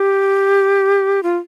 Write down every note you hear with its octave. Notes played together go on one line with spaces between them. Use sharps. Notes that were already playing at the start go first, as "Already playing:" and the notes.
Already playing: G4
F4